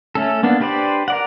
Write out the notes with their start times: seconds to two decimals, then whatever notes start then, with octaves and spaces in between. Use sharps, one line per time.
0.15 A3 C#4 A4
0.43 A#3 B3 D4
0.60 D4 G4 B4 C5 D5
1.08 A#4 D5 F#5